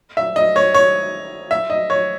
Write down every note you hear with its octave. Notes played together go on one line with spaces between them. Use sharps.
E5
D#5
C#5
C#5
E5
D#5
C#5